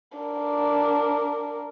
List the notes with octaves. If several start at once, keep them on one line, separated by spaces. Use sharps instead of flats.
D4 A#4